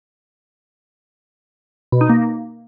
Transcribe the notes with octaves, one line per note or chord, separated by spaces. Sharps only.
B2
D#4
A#3